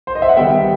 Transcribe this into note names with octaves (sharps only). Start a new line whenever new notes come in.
C5
D#5
E5
F#5
D#3 G3 B3 E5 G5